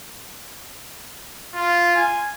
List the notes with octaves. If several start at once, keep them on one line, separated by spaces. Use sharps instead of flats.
F4
G#5